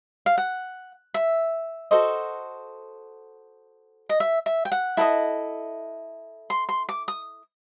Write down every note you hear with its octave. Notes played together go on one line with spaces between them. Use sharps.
F5
F#5
E5
F#4 A4 C5 D#5
D#5
E5
E5
G5
F#5
E4 A4 C5 D#5
C6
C6
D6
D#6